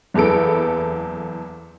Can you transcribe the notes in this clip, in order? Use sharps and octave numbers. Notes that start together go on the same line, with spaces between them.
F#1 E2 B3 A4 D7